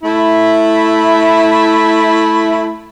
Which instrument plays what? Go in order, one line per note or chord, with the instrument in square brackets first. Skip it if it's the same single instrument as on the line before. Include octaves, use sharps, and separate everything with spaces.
[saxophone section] A3 E4